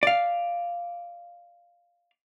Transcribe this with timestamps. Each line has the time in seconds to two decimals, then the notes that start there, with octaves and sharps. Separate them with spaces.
0.03 D5 F5